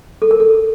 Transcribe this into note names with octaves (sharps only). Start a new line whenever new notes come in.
A4
A#4
A4